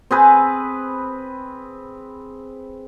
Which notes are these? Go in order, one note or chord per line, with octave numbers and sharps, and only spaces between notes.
C4 G#4 B4